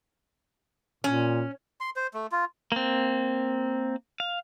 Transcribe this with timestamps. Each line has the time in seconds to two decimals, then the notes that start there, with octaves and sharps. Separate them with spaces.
1.04 A#2 C#4
1.80 C6
1.96 C5
2.14 A3
2.32 F4
2.72 A#3 C4
4.20 F5